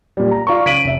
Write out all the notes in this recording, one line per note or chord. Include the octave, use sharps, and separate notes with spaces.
A#2 G3
A#5
F4 D5 A#5 C#6
C#3 B6 D7 D#7 F#7
F1 E5